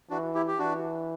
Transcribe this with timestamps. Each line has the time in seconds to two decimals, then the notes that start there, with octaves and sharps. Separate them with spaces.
0.10 E3 D4 F#4
0.34 E4 G4
0.48 G4
0.58 E3 D4 F#4